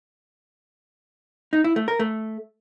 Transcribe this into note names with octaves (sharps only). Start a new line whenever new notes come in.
D#4
E4
A3
A#4
A3